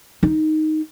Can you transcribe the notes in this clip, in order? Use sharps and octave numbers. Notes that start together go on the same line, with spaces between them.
D#4